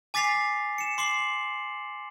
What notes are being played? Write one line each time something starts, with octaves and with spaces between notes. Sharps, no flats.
G#5 D6 A6 B6 C7 F7
C#7 E7
C6 D6 C7 F#7